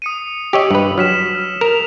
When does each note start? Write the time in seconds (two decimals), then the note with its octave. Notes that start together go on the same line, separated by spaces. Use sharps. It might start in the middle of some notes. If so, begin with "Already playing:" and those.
0.02 D#6 C#7 D#7
0.53 G4 C#5 D#5 E6
0.71 G2 B4
0.98 F#3 F6 B6 E7
1.35 F6
1.61 A#4 F7